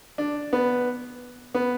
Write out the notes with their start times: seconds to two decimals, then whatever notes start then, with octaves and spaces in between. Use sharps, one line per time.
0.18 D4
0.53 B3
1.55 B3